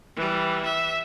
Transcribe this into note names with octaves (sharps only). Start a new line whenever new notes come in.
E3 G3
E5